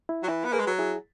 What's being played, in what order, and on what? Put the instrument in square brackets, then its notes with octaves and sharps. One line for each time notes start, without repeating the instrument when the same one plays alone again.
[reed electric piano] E4
[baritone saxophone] F#3
[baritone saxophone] E3 [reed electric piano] E4
[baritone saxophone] B3
[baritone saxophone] A#3 [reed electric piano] G#4 B4
[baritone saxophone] G#3
F#3
[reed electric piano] E4 G#4